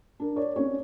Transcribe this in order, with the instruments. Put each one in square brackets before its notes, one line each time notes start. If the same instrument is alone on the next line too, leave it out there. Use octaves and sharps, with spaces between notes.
[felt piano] D4 A#4
C#5 D5
C4 C#4 C#5